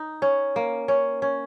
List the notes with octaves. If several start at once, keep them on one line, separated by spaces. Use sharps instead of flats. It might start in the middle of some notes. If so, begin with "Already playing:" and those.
Already playing: D#4
C#4
A#3
C#4
C#4